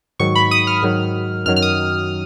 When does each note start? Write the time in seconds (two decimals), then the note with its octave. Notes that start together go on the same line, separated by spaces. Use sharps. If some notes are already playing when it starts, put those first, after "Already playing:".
0.19 G#2 D#3 F#3 C#6
0.35 B5
0.51 D#6
0.67 F6
0.83 G#2 D#3 F#3
1.46 F#2 D#3 F#3 F6
1.56 F6
1.62 D#6